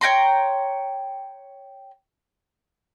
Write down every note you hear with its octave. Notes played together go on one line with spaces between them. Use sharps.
C#5 G5 A#5 C6